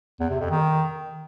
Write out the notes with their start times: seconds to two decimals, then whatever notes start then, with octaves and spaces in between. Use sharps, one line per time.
0.20 E2
0.30 C3
0.40 F2
0.50 D#3